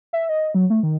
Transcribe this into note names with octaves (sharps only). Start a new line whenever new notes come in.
E5
D#5
F#3
A3
D#3